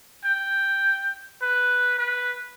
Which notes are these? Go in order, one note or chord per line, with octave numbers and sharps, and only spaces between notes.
G5
B4
B4